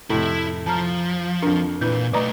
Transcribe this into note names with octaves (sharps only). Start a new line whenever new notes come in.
F2 A2 C3 F3 E4
F3 A5 A#5 F6
F2 D4 A#4
A#2 E3 B4 G6
B1 A3 B4 D5 D#5 A#5